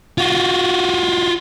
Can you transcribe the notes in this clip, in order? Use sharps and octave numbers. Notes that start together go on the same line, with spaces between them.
F4 F#4